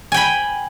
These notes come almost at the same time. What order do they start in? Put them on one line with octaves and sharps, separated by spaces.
G#5 G5 B5